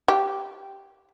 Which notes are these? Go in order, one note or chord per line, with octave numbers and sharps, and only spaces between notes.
G4